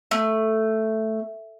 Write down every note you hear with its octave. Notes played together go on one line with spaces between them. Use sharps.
A3